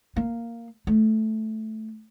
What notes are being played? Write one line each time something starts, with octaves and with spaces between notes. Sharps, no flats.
A#3
A3